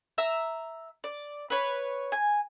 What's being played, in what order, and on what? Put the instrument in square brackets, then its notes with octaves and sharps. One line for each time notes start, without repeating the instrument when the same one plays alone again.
[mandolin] E5 A#5 E6
D5
B4 C#5
G#5